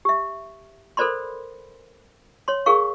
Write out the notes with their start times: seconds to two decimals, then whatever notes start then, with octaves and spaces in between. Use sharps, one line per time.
0.05 G4 E5
0.97 A4 A#4 C5 D5 B5 C6
2.48 C#5 C6
2.66 G#4 A#4 F5 C#6